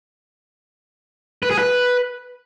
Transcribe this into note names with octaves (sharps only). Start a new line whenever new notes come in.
B4
G#4
B4